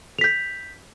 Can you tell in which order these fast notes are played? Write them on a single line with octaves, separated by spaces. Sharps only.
F7 B6 G6